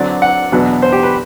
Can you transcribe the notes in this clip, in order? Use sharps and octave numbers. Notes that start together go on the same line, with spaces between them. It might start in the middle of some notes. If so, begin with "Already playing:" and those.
Already playing: D3 F#3 C4 D5
F#5
E2 B2 F#3 B3 D4
C5
G4
B4